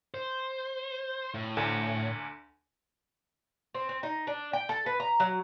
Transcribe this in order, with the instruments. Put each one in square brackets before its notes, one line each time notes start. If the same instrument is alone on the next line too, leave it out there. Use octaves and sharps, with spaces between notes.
[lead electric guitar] C5
A2
[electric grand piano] D2 D3 G#5
[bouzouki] C4
C4
D#4
D4
G5
A4
B4
A#5
F#3